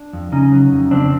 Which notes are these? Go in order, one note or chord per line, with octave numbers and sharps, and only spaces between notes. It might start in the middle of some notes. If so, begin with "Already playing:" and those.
Already playing: D4
F2
C#3 C#4 D#4
F#3
F2
C#3 C4 D4